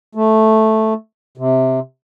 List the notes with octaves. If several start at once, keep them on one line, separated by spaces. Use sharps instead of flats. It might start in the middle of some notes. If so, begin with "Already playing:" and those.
A3
C3